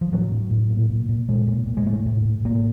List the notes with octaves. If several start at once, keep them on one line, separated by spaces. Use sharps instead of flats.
F3
A2 F#3
A2
A2
A#2
A#2
A#2
A#2 G#3
A#2
A#2
G#3
A2 A3
A2
A2
A2 A#3